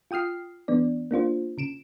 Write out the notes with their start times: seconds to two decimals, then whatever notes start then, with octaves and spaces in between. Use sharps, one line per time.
0.11 F4 G5 D#6 F6 C7
0.68 E3 B3 D4 D5
1.11 A#3 D4 F4 C5
1.58 C#3 D7 E7